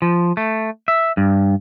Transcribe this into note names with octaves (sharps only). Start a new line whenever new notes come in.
F3
A3
E5
G2